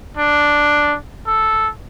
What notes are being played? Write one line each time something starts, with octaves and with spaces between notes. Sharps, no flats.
D4
A4